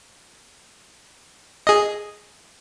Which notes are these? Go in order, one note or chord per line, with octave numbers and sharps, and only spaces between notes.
G#4 D#5